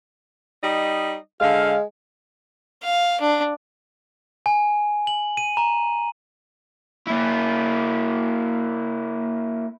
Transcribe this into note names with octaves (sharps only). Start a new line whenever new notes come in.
G3 D#4 D#5
D3 G#3 F5
F5
D4
G#5
F#7
D#7
A#5
A#3 E4